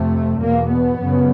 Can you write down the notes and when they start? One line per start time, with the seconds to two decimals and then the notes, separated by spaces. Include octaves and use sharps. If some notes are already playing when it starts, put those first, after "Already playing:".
Already playing: F2 C3 A3
0.40 E2 B2 A#3
0.70 B3
0.99 F#2 C#3